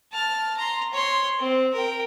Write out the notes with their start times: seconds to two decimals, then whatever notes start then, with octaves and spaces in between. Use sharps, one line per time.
0.12 A5 F6
0.57 A#5 C6
0.93 C#5 C6
1.38 C4
1.73 A#4 G5